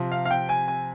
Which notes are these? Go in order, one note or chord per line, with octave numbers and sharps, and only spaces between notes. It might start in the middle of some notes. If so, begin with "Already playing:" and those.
Already playing: C3 F3 C4
F5
F5
G5
G#5
G#5